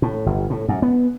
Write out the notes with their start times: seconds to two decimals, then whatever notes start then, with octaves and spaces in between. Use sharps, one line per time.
0.02 A2
0.26 G1
0.50 A2
0.69 F#2
0.82 B3